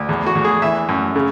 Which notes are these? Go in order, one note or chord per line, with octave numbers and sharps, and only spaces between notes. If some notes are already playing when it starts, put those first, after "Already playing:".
Already playing: D2
E2
F#4
E2
G#4
E3 E5
F#2
C#3